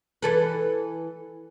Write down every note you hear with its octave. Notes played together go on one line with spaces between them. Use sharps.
E3 A4 B4